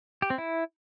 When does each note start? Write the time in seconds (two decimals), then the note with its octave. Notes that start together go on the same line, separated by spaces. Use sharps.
0.22 G4
0.30 C4
0.38 E4